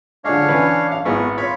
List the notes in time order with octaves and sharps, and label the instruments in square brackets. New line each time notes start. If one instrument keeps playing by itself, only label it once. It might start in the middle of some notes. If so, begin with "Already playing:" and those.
[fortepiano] D3 G#3 [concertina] D4 C#5 F5
[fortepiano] E3 C#4 B4
F5
[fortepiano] G#1 B3 E4 [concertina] C#6
[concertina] F4 B5 [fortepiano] C#5